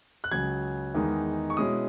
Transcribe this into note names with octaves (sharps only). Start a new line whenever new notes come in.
F#6
C#2 C#3 F#3 G#6
E2 D#3 G#3 D#4
C#6
B2 G#3 C#4 E4 D#6